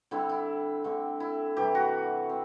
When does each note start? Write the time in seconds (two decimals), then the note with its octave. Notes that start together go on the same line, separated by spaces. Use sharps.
0.11 D3 G3 C4 E4
0.29 E4
0.84 D3 A3 C4
1.20 E4
1.57 C3 E3 G3 G4
1.75 F#4
2.29 C4